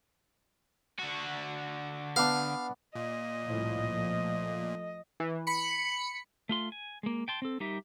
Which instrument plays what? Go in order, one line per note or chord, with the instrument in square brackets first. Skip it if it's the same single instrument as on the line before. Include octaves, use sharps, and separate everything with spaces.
[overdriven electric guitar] D3 F#4
[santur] B3 D4 [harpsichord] F5
[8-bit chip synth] A#2 [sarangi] D#5
[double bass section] C2 A2 F3
F3 A3
[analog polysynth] E3
B5 C#7
[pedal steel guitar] A3 F4 C6
G#5
G#3 A#3
G5 A5 C6
C4 A4
G3 D#4 G4 A#4 E5